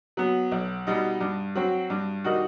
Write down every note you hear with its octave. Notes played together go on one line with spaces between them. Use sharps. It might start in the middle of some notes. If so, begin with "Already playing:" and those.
F#3 B3
B1
B2 G3 D#4
G2
F#3 C4 F#4
G2
D#3 G3 D#4 F#4